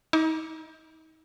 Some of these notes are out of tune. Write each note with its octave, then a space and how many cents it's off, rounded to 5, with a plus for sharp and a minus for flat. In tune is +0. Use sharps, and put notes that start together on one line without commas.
D#4 +35 D6 -5